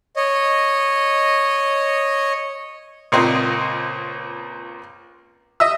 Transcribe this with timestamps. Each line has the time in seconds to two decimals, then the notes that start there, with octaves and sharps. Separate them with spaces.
0.16 C#5 D#5
3.12 C#2 A#2 A#3 C4 D#5
5.60 D#5 E5 E6